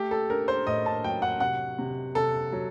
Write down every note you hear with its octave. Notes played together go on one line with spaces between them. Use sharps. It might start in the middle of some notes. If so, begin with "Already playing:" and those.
Already playing: A3 G4
A4
D4 A#4
C5
A2 D#5
A5
F#3 G5
F#5
C3 F#5
C3
C3 A4
F#3